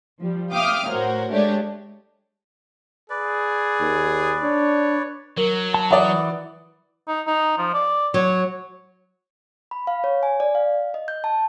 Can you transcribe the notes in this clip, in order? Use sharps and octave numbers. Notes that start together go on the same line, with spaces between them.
F3 G3
E5 F5 G5 D6 D#6 F6
A2 F#4 A#4 C5 C#5
G#3 A3 D4 G4 C#5 D5
G#4 B4 D5
D#2
D4 C#5
F#3 A#4
A5
E3 D5 E5 F#5 A#5 D#6
D#4
D#4
F3
D5
F#3 C#5
B5
F5
C#5
G#5
D5
F5
D#5
G6
A5